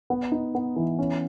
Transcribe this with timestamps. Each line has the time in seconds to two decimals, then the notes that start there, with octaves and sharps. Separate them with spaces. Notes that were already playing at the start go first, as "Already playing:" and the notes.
0.10 B3
0.32 D#4
0.55 B3
0.76 E3
0.99 C#4